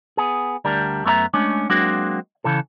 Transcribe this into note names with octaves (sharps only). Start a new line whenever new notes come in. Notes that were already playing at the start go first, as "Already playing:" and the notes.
B3 G#4
D2 G3 D4 A#4
F#2 A3 B3 A#4 E5 A#5
G#3 A3 C#4 D4
F#3 G#3 A#3 C4 D4 F#4
C#3 E3 A4